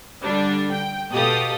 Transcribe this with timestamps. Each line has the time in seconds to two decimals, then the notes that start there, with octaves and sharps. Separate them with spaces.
0.22 D3 G3 D4
0.73 G5
1.12 B2 G4 A4 F5 D#6